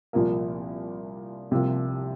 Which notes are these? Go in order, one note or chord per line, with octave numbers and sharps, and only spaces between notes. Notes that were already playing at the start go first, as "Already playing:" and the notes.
C2 A#2 F3 A#3
C2 C3 F3 A#3 F4